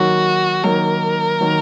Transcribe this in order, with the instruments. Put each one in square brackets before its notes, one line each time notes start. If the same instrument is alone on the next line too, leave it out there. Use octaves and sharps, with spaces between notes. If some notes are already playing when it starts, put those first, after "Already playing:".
Already playing: [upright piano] D#3 F#3 A#3 [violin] F#4
[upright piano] D#3 F#3 A#3 [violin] A#4
[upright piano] D#3 F#3 A#3